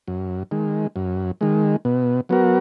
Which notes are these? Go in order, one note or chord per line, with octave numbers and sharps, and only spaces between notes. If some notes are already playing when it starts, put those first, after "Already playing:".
F#2
D#3 G#3
F#2
D#3 G#3
B2
F#3 B3 F#4 A#4